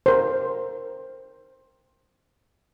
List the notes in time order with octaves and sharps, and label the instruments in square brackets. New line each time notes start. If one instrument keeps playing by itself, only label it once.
[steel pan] A#4 C5